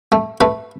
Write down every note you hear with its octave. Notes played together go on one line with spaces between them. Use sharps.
A3
A3 B4